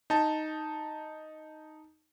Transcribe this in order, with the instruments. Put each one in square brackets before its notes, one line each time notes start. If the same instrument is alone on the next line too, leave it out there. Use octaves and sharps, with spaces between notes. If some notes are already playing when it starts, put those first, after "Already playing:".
[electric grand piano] D#4 A5